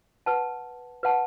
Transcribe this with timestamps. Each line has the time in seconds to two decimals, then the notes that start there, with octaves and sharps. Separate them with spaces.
0.26 B4 F#5 A5
1.03 B4 F#5 A5